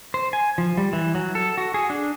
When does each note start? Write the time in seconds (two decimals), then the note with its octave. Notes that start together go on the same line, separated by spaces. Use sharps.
0.14 C5
0.33 G#5
0.58 F3
0.78 G3
0.93 E3
1.15 F#3
1.35 A4
1.58 F#4
1.74 G#4
1.90 D4